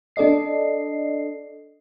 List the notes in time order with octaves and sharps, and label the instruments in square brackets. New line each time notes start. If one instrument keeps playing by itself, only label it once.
[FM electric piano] D4 A4 D5 D#5 C7